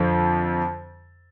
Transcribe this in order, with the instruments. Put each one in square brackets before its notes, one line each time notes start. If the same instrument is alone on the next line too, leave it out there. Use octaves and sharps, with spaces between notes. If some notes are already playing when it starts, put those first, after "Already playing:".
Already playing: [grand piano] F2 D3 F3